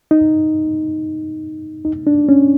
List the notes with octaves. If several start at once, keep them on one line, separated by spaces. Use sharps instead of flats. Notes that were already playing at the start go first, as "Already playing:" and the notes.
D#4
D#4
D4
C#4